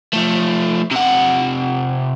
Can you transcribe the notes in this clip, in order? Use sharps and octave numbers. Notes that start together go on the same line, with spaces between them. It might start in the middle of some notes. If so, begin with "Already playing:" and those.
F3 A3
C3 F#5